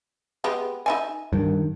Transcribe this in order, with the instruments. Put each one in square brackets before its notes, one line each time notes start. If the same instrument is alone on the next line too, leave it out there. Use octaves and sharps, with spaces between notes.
[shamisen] G#3 B3 G4
D#4 E5 G#5
[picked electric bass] G2 D#3